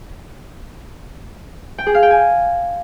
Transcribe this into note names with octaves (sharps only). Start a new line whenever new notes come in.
G5
G#4
F5
G5
G#5